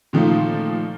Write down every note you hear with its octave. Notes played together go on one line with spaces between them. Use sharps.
A#2 D#3 F3 A3 D#4 F4